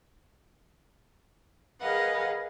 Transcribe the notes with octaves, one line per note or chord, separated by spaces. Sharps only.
G#4 A#4 B4 D#5 F5 F#5